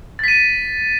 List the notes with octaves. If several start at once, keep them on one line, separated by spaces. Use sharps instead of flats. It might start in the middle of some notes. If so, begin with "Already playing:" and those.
A6 B6 D#7